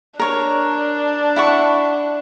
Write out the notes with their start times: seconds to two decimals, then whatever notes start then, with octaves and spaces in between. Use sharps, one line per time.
0.19 D4 A#4 C#5
1.36 E4 F#5 C#6